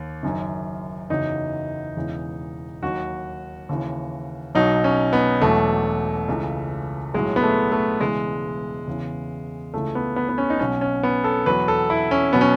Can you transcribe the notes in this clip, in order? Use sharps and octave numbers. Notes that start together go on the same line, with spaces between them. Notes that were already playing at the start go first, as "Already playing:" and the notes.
Already playing: D#2
F#1 F#2 D#3
F#1 E2 C#3 F#3 D#4
E1 E2 C#3 E3
D#2 D#3 F#3 F#4
D#2 C#3 E3
B1 B2 F#3 D#4
C#4
B3
E1 E2 B2 F#3 A3
C#2 C#3 E3
B1 A2 F#3 G#3
B3
A3
A3
E1 E2 C#3 E3 G#3
E2 C#3 E3
C#2 C#3 E3 A3
B3
B3
B3
C#4
D#4
B1 B2 F#3 C#4
C#4
B3
A4
E2 B2 F#3 B4
A4
E4
C#4
B2 F#3 B3
C#4